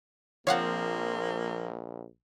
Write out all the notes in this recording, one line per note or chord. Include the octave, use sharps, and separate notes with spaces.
A#1 F3 A#3 C4 C#5 F5 F#5